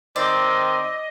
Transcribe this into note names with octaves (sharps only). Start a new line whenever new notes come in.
D#3 C4 D5 D#5